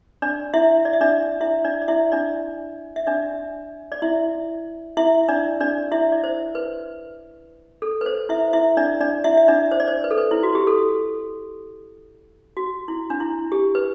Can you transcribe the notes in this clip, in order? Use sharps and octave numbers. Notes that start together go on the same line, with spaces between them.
D4 D5
E4 E5
D5
E5
D4 D5
E4 E5
D4 D5
D5
E4 E5
D4 D5
E5
D4 D5
D5
E4 E5
E4 E5
D4 D5
D4 D5
E4 E5
D5
C5
B4
A4
B4
C5
E4 E5
E4 E5
D4 D5
D4 D5
E4 E5
E5
D4 D5
C5
D5
C5
B4
A4
B4
E4
F#4
G4
A4
F#4
E4
D4
E4
G4
B4